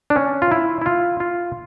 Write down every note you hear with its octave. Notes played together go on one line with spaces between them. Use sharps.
D4
C#4
F4
E4
E4
F4
F4